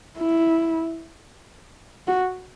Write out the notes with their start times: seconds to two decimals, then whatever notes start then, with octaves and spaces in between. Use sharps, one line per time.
0.17 E4
2.07 F#4